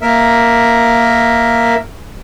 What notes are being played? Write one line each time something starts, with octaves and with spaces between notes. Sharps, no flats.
A#3 A#4 E5